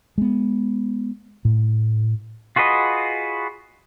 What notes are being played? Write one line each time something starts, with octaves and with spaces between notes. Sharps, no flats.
G#3 B3
A2
F4 F#4 G#4 B4 D#5